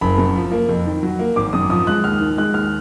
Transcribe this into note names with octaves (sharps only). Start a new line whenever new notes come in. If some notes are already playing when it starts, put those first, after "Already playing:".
F#1 B5
F#2
F3
A#3
F2
D#3
F#3
A#3
G#1 D6
F#2 D#6
F3 D#6
G#3 F#6
D#2 F6
D#3
G#3 F#6
D#2 F6